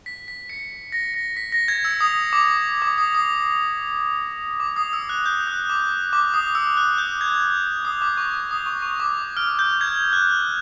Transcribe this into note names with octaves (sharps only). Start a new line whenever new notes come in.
B6
B6
B6 C#7
A#6
A#6
B6
A#6
G#6
E6
D#6
D6
D6
D#6
D#6
D6
D#6
E6
F#6
G6
F#6
D6
D6
D#6
E6
F#6
G6
G#6
D#6
D6
C#6
D6
D#6
C#6
C#6
D6
F6
G6
G#6
F#6